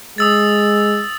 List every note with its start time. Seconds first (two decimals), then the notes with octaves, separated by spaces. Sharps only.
0.18 G#3 D#6 E6 A6